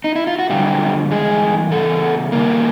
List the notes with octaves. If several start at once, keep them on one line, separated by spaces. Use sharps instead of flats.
D#4
E4
F4
F#4
F#2 D3 F3 G3 G4
G2 E3 G#3 G#4
E2 C#3 A4
G2 D#3 A#3 A#4